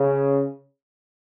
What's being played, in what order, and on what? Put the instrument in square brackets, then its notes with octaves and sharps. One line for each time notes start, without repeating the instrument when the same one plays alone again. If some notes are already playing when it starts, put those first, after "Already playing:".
Already playing: [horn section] C#3